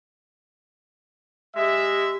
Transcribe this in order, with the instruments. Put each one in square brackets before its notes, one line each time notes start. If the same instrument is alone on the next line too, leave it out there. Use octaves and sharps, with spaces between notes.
[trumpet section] G#3 E5 [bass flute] G4